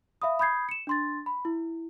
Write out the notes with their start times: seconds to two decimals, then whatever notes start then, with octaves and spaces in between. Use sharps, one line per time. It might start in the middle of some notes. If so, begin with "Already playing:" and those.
0.22 E5 F5 B5 D#6
0.39 B5 D#6 G6 G#6 C7
0.69 C#7 E7
0.87 D4 C6 A6
1.26 B5
1.45 E4